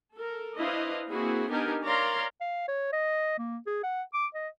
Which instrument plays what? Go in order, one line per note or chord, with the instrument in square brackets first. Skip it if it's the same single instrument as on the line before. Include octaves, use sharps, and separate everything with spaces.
[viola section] A4 A#4
D4 E4 B4 C5 D#5 F5
A#3 C4 E4 F#4 G#4
B3 D4 D#4 G4 A#4 G#5
A#4 C#5 D5 F5 A#5 C6
[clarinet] F5
C#5
D#5
A#3
G#4
F#5
D6
D#5